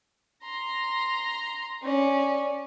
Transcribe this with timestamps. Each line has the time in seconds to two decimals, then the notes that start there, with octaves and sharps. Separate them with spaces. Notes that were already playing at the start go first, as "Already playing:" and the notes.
0.43 A#5 C6
1.82 C#4 D5